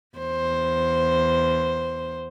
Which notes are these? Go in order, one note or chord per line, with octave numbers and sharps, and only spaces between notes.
E2 C5